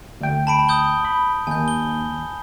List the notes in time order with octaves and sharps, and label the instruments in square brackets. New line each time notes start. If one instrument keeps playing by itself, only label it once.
[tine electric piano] D2 G5
[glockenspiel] A5 B5 D7
D#6 G6 G7
[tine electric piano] B5
[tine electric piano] D#2 [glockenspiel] G#5 G6
[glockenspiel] G7